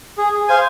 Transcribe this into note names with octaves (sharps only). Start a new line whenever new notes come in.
G#4
C5 F5 G#5